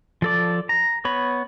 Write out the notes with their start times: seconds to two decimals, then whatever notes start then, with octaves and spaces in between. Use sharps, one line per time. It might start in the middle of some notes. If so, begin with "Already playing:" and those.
0.22 F3 A4 D5
0.69 A#5
1.05 B3 C#5 B5